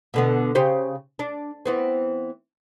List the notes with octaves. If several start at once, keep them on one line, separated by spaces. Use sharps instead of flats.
B2 D3 B3
C#3 G4 C5
D4
E3 B3 C4